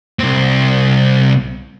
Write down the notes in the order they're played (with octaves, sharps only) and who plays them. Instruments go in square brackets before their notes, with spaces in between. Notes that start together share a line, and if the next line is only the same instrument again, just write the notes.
[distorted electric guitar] C2 C4